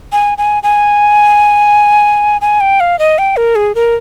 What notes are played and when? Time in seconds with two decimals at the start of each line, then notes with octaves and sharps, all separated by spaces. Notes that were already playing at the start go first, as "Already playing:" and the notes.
0.12 G#5
0.38 G#5
0.63 G#5
2.41 G#5
2.60 G5
2.80 F5
2.99 D#5
3.18 G5
3.37 A#4
3.56 G#4
3.75 A#4